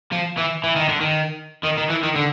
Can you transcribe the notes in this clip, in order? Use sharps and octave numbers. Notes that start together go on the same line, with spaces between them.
F3
E3
E3
D#3
D3
D#3
D#3
D#3
E3
D#3
D3